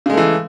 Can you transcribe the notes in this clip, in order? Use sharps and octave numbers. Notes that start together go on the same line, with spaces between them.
C#3 E3 G#3 A3